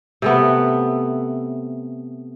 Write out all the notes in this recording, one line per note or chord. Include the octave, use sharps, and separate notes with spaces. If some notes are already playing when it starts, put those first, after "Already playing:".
C3 A3 B3